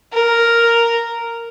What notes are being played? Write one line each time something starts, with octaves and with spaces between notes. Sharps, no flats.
A#4